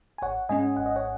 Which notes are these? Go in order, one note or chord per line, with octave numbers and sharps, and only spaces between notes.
G#5
G#1 C#5 F#5
G#2 G#3 C#4 D#5 G#5
G#1 F#5
D#5
C#5 F#5